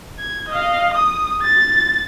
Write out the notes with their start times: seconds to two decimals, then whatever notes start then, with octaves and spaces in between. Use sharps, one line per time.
0.19 G#6
0.49 D#5 F5
0.94 D#6
1.42 A6